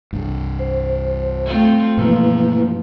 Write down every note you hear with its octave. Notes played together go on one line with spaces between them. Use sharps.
C2 G2
C5
A3 C4 F4
G2 B2 E3 F3 A#3 E4 B4